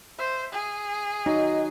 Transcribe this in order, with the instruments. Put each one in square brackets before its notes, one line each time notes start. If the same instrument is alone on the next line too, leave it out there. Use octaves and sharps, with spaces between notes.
[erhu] C5 [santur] E5
[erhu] G#4
[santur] F#3 [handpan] D#4 [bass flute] D#5